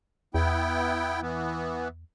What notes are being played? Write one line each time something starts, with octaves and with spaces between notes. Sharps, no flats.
E2 B3 E4 G5
E3 B3